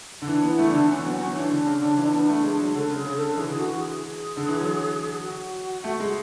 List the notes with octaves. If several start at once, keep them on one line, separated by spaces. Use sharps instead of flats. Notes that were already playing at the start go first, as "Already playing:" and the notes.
D3
E3 D4
B3
E4
A3
E3 D4
D3
E3 C#4
F#3 B3
F#3 C#4
E3 D4
D3
C#3
D3
E3
B3
A3
G#3
F#3
D3 A4
C#3
G#4
C#3
D3 A4
E3 G#4
D3
E3 F#4
G#4
G#4
D3
E3
F#3
F#4
A3
G#3